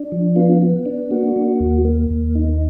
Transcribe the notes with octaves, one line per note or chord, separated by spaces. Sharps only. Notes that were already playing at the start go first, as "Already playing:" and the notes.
Already playing: D4
F3
B3 F4
B3
D4
A#3 F#4
A#3
D#2
A#3
D#2
D#4